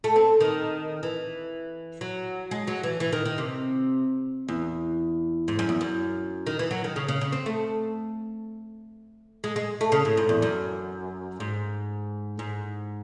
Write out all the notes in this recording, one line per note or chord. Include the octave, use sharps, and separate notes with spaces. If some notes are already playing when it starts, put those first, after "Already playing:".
A3
C4
D#3
E3
F#3
G#3
F#3
E3
E3
D#3
D#3
C3
E2
G#2
F#2
E2
F#2
D#3
E3
F#3
D#3
C#3
C#3
C#3
C4
A3
G#3
G#3
A3
C#3
A2
G#2
E2
F#2
G#2
G#2